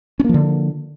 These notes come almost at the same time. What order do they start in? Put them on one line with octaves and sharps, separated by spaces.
C#4 A#3 F3 D3